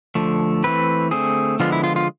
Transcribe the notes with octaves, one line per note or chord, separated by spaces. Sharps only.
D3 F3 A3
E3 A3 C4 B4
D3 A3 C4 G#4
D3 F3 G#3 B3 F4
E4
F4
F4